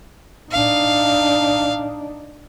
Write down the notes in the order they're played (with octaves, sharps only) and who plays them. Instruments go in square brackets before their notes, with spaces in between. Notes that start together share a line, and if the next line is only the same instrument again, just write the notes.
[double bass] D4 D#4 [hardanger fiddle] F5